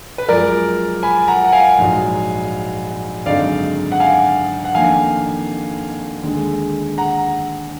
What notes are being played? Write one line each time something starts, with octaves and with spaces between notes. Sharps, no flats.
B4
F#2 F3 G#3 A#4 D5
G#5 B5
F#5 A#5
F#5
F5 G#5
A#1 G#2 F#3
G#1 F#2 D3 G#3 D#4 D5 F5
F#5
F5 G#5
F#5
F2 D#3 A#3 D4 F5 G#5
D#2 D3 G#3
F#5 A#5